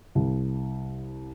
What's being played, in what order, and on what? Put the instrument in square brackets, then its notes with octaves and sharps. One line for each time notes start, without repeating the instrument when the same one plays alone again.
[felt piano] C2